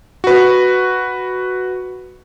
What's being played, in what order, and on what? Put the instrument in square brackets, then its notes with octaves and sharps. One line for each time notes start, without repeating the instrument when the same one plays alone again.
[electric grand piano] F#4 B4